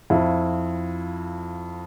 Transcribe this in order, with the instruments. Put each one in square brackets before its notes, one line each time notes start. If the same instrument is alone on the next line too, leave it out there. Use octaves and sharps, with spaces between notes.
[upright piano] F2 E4 F4